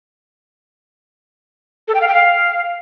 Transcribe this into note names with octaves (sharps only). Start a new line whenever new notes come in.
A4
G5
F5
G5
F5